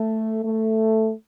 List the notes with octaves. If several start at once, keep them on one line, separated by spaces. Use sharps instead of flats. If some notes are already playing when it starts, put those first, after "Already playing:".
Already playing: A3
A3